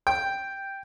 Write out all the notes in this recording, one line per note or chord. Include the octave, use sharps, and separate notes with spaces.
G5